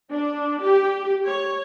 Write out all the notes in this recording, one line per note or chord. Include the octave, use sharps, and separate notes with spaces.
D4
G4
C#5